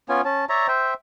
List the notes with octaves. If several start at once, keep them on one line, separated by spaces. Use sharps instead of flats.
B3 C#4 F4 G#5
C#4 A5
C#5 D5 E5 A#5
C5 E5 G5